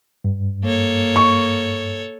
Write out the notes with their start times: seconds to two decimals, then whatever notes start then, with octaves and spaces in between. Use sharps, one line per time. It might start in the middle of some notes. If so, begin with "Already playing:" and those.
0.24 G2
0.64 A#3 A4 C#5
1.16 C#6